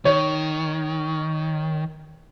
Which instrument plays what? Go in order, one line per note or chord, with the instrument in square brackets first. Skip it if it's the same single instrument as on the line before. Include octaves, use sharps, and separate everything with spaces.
[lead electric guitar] D#3 [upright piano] C#5